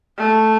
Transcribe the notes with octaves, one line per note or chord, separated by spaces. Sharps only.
A3